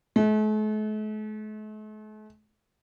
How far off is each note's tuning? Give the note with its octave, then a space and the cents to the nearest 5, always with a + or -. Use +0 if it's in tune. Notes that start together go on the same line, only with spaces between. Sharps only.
A3 -45